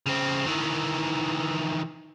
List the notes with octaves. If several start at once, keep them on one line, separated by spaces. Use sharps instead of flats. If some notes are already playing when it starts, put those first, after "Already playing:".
C#3 C4
D#3 E3